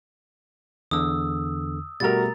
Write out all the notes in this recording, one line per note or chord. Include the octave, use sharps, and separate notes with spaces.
E2 D3 D#6 E6
B2 G3 A3 F#4 A#4 A#5 A6